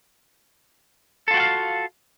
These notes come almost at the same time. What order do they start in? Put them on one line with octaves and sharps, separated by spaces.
A4 F4 F#4 G5 F5